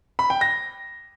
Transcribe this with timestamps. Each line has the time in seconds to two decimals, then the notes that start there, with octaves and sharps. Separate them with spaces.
0.19 B5
0.30 G5
0.41 A#6